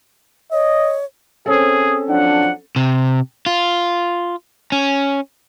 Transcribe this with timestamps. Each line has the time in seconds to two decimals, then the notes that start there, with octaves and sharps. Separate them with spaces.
0.52 C#5 D#5
1.46 C4 C#4 G#4 A4
2.08 F3 F#3 D4 F#5
2.76 C3
3.46 F4
4.72 C#4